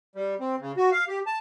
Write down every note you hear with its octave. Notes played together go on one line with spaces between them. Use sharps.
G3
C4
C#3
F#4
F5
G4
A5